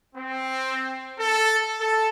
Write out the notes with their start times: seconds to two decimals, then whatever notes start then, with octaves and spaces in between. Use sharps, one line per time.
0.15 C4
1.19 A4
1.79 A4